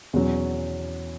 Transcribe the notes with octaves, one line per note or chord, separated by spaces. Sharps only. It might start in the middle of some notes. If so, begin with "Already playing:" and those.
E2 B2 F#3 C#4